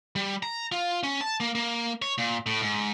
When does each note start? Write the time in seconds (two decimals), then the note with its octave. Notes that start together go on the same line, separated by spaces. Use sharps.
0.16 G3
0.43 A#5
0.72 F4
1.03 C#4
1.21 A5
1.40 A#3
1.55 A#3
2.02 C#5
2.18 A#2
2.46 A2
2.61 G#2